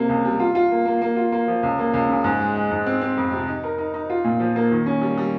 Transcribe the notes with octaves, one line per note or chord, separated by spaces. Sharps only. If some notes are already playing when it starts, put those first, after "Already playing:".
Already playing: C3 A#3
C#2
G3
F4
F4
A#3
A#3
A#3
F4
A#3
F3
C#2
A#3
C#2
C#3
G#2
G#3
G#3
G#2
C4
C4
F2
C3
D#4
A#4
D#4
D#4
F4
A#2
F3
A#3
D#3
C#4
G3
G3